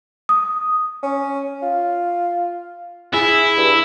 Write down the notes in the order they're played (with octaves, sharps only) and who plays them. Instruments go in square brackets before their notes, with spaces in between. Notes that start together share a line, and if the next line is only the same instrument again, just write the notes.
[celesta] D#6
[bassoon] C#4
F4
[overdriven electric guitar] E4 [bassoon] G#4
[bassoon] G2